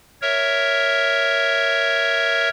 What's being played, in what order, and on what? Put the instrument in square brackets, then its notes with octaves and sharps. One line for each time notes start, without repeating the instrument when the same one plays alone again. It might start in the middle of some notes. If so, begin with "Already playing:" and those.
[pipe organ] A#4 C#5 E5